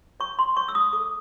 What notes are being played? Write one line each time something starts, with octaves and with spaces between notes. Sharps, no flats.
C#5 C#6
C6
C#5 C#6
E6
D#6
A4 D6